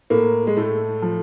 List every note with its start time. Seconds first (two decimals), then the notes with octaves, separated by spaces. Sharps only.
0.10 A2 A#3
0.47 G#3
0.57 A2 A3
1.02 F3